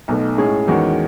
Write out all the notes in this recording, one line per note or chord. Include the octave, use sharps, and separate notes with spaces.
B1 B2 A3
A2 G#3 C#4 G#4
E2 D#3 G#3 C#4 F#4